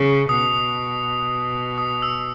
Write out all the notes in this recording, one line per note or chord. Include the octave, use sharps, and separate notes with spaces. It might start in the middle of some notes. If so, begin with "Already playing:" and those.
Already playing: C#3
B2 D#6
D#6
E6